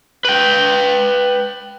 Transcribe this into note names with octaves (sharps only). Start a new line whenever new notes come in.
B4 G5